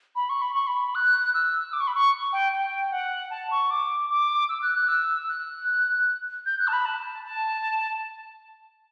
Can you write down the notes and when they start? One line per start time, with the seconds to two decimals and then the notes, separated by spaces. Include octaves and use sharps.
0.15 B5
0.29 C#6
0.42 B5
0.54 C#6
0.67 B5
0.95 F#6
1.34 E6
1.73 D6
1.80 C#6
1.87 B5
1.95 C#6
2.32 G5
2.52 G5
2.91 F#5
3.30 A5
3.51 C#6
3.70 D6
4.09 D6
4.49 E6
4.62 F#6
4.75 F#6
4.88 E6
5.28 F#6
6.46 G6
6.59 F#6
6.67 A5
6.73 B5
6.85 A5
7.24 A5